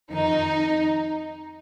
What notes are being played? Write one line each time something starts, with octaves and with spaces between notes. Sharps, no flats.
F2 D#3 D#4